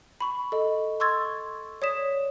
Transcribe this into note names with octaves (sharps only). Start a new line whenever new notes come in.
B5 C#6
A4 D#5
C6 C#6 E6 G#6 A6
C#5 D5 D#6 B6 E7